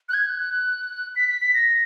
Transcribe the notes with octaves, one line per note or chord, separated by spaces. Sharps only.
F#6
G#6
F#6
F#6
B6
B6
B6
A#6